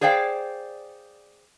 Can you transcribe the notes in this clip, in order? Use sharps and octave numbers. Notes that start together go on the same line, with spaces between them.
G#4 C5 D5 F5 G5